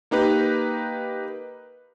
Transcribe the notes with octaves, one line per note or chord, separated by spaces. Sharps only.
A#3 D#4 G4 B4